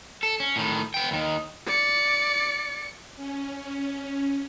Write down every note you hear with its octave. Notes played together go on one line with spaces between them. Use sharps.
A4
C#4
A2 D#3
B3 G5
D#2 D#3
D5 C#7
C#4